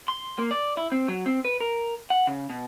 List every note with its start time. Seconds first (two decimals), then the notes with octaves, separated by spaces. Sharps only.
0.08 C6
0.39 A#3
0.51 D5
0.77 E4
0.92 C4
1.08 F#3
1.26 C4
1.45 B4
1.61 A#4
2.10 F#5
2.27 C#3
2.50 B2